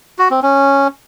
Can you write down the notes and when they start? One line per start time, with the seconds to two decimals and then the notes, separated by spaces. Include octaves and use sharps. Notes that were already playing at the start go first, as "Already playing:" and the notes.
0.19 F#4
0.31 C4
0.43 C#4